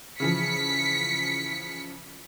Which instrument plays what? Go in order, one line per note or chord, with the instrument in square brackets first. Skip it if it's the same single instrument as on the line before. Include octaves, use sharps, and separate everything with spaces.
[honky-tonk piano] C#3 E3 F3 [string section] B6 C#7